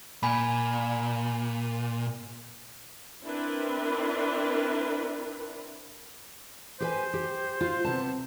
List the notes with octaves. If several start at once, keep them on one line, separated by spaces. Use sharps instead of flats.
A#2 G#5 B5
C4 D4 E4 A#4 B4
G4 B4 C5 G#5
G4
F4
C3 B3 A5